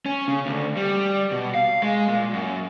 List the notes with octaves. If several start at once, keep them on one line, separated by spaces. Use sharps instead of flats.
C#4
C#3
D2
G3
B2
F5
G#3
A#2
F#2